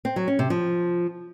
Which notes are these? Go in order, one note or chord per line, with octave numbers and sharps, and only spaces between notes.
C4
F#3
C#4
C3
F3